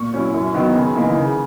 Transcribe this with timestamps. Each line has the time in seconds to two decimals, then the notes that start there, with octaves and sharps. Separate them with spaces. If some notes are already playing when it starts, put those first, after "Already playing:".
Already playing: A#2 C#6
0.12 F#3 C#4 E4
0.34 F#2
0.54 D#3 F#3 B3 D#4
0.74 C#3
0.95 E3 A#3 D#4
1.16 C#3